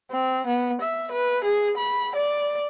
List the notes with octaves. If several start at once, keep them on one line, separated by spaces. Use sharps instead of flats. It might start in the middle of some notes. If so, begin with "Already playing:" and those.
C4
B3
E5
B4
G#4
B5
D5